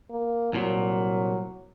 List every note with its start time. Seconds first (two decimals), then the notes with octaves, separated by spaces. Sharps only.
0.10 A#3
0.53 C2 A#2 F#3